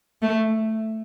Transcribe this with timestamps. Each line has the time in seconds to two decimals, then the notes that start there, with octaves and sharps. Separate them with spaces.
0.22 A3